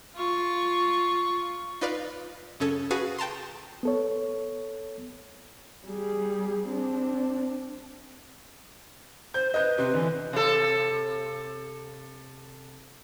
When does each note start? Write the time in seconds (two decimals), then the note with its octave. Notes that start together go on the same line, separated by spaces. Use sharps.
0.16 F4 C#6
1.81 D#4 F4 B4 D5 F5
2.60 F#2 C#3 C#4 A4 G#6
2.90 F#4 G#4 B4 F5 G#5 A5
3.18 G5 A5 A#5 C6
3.83 B3 A4 C#5
5.87 G3 G#4
6.68 C4 D4
9.34 C5 G6
9.54 B4 D#5 G6
9.78 C3 C4 B4
9.94 D3 E3
10.33 C3 A4